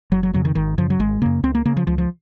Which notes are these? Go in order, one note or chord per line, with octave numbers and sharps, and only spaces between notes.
F#1 F#3
F#3
F2 C#3 F#3
D#3
G#1 D#3
F#2 C#3 F3
F#3
G#1 G#3
F#2 C#3 A#3
C#2 C4
A#3
C#3 A#3
F3
C#2 F3
F3